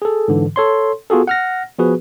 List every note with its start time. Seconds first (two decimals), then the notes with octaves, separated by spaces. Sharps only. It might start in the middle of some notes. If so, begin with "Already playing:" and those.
0.02 G#4 A4
0.28 G#2 D3 E3
0.56 A4 C#5 C6
1.10 B3 F4 F#4 G#4 A4
1.27 F#5 F6 A#6
1.79 F3 B3 F#4 G#4 B4